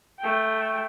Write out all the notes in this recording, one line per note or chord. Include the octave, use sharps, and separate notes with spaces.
A3 G5